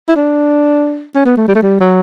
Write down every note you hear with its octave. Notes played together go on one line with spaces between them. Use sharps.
E4
D4
C#4
B3
A3
G3
A3
G3
F#3